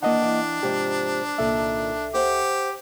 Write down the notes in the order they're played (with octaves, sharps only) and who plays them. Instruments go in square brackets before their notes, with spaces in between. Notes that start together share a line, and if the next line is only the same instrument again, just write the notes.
[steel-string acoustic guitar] D#3 E3 [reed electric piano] A#3 D#5 F#5 [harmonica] D4
[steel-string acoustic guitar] E3 G5
[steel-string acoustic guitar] G#2 C3 F3 [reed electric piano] G4
[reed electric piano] C2 A4 E5 [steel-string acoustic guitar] A#2 D#3
[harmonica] G4 [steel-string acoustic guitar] C5 F#5